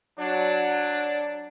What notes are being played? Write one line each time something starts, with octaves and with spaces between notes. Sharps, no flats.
F#3 D4